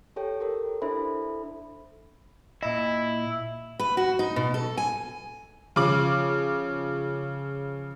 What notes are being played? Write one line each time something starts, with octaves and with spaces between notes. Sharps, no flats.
G4 A4 C#5 G5
G4 A4 A#4
D4 E4 A4 C5 E5 B5
A#2 E4 D#5
B4
F#4
D#4
B2
A4
G#5
C#3 F3 D6 F#7